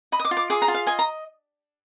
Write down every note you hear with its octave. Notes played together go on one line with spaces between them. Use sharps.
D#5 B5
D#6
D6
F4
D6
G#4 D6
A#5
F4
F5
D#5 G#5
A#5